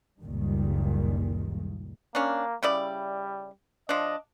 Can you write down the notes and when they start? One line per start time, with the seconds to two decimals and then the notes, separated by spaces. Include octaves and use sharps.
0.22 F#1 C#2 A#2 D#3 G3
2.15 A#3 C#4 D4
2.63 C#3 G3 E4 D5
3.89 F3 D4 D#5